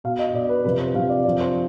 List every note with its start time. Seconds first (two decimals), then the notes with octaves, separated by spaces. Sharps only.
0.04 B2 F5
0.19 D#5
0.34 B2 D5
0.49 B4
0.64 C3 F3 B4
0.79 C5
0.95 C3 F3 F5
1.09 D5
1.25 C3 F3 D5
1.40 C5